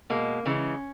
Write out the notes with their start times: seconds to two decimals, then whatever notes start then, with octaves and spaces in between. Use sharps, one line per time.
0.10 B2 G#3 A#3
0.45 C#3 E3 G#3 C#4